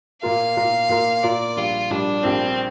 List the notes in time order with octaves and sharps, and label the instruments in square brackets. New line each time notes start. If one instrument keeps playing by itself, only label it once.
[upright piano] A#2 A#3 F4 A#4 [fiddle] F5
[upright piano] A#2 A#3 F4 A#4
A#2 A#3 F4 A#4
[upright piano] A#2 A#3 F4 A#4 [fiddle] D5
[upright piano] A#1 A#2 G3 [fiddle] F4
[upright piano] A#1 A#2 G3 [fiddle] D4
[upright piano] A#1 A#2 G3 [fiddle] C4